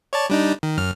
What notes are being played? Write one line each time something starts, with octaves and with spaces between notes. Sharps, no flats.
C#5 D5 A5
G3 D4 D#4
D#3
F#2 F6